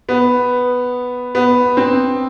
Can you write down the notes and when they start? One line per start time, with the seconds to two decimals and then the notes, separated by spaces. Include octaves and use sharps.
0.09 B3
1.35 B3
1.77 C4